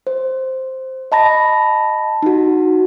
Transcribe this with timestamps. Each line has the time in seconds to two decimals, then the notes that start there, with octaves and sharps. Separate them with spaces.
0.07 C5
1.12 D#5 A5 B5 A#6
2.22 D#4 F#4